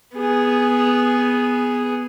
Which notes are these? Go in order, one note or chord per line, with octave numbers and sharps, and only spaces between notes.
B3 G#4